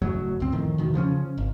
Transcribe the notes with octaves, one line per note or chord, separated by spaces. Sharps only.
F#1 F#2 A2 F#3
C#2 C4
F2 A2 D#3
E2 B2 D#3
C#3 F3 B3 C#4
G#1